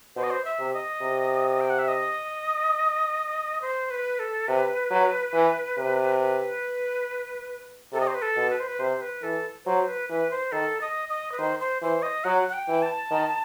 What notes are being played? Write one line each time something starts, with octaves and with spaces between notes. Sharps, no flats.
B2 C5
D#5
C5
E5
C3
D#5
C3
G5
F#5
E5
D#5
C5
B4
A4
C3 B4
F#3
E3
C3
B4
C3 A4
D#5
C5
B4
A4
B2
B4
C5
B4
C3 C5
B4
E3 A4
F#3 C5
B4
E3 B4
C5
D#3 A4
D#5
D#5
B4
D#3 C5
C5
E3 C5
D#5
F#3 F#5
F#5
G5
E3
A5
D#3